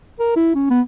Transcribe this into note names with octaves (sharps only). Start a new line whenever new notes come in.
A#4
E4
C#4
B3